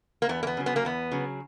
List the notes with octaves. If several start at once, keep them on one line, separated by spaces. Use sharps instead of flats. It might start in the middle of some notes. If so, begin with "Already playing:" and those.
A#3
E2 B3
A#3
B3
C#3 F#3
B3
A#3
E2 B3
C#3 F#3